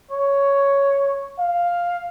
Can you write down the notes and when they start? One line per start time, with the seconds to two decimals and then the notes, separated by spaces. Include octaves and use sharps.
0.11 C#5
1.39 F5